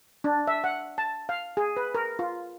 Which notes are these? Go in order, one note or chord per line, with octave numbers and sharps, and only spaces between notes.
D4
E5
F#5
A5
F5
G#4
B4
A#4
F4